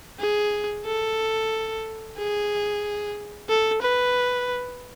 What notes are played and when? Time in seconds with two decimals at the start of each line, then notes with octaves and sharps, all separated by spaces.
0.20 G#4
0.85 A4
2.18 G#4
3.49 A4
3.82 B4